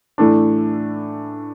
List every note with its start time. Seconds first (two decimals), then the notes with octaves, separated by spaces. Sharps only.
0.18 A2 E3 A3 D4